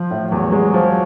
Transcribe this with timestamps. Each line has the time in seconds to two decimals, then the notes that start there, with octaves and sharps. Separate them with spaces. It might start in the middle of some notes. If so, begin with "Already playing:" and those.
Already playing: F3
0.11 A2
0.32 E2 F#3
0.52 G#3
0.74 F3